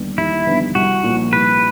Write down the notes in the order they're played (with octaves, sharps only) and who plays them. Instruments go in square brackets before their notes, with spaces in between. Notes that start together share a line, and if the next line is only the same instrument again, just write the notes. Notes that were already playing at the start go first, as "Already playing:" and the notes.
Already playing: [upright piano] D#2 D3 G3 B3 D#4
[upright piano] D#2 [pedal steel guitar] E4
[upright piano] D3 G3 B3 D#4
[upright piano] C2 [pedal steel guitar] F#4
[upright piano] A#2 F3
[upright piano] C2 [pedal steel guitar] B4